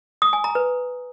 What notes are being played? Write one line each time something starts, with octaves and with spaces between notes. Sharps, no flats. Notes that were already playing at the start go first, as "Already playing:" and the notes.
D#6
G#5
A#5
B4